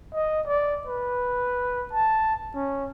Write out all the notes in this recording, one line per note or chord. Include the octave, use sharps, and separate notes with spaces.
D#5
D5
B4
A5
C#4